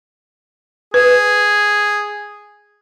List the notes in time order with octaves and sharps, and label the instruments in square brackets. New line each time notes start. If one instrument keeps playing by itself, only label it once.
[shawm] G#4 [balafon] B4